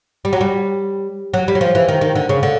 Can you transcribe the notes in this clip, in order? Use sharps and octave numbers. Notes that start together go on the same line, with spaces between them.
G3
F#3
G3
F#3
G3
F#3
F3
E3
D#3
D#3
D3
C#3
D3